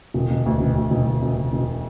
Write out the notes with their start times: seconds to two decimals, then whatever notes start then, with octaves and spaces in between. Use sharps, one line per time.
0.14 E1
0.31 E1
0.46 D2
0.60 E1
0.76 D2
0.91 E1
1.06 E1
1.23 E1
1.37 E1
1.53 E1